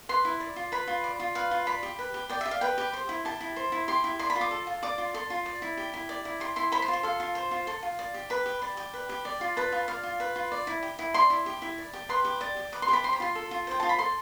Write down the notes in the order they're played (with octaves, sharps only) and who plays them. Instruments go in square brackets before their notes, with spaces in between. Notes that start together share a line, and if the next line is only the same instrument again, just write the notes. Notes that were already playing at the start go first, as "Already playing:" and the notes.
[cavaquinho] B4 C6
E4
D5
F4
B4 B5
F4
D5
F4
B4 F5
F4
D5 B5
G4
B4
G4
D5 G5
E5
G4
F5
B4 G5
G4
C5
E4
G4 A5
E4
C5
E4
G4 C6
E4
D5 C6
B5
F4
D6
A4
F4
D5 D6
F4
A4 C6
F4
D5
E4
G4
E4
D5
E4
G4 C6
E4 C6
C5 B5
C6
F4
C6
A4 F5
F4
C5
F4
A4 C6
F4
D5
G4
B4 B5
G4
D5
G4
B4
G4
D5
F4
B4 A5
F4
D5 F5
F4
B4
F4
D5
E4
G4
E4
D5 C6
E4
G4
E4
D5
G4
B4 C6
G4
D5
G4
B4 D6
C6
G4
B5
C5 C6
B5
F4 C6
A4
F4
C5 G5
F4 A5
B5
A4 C6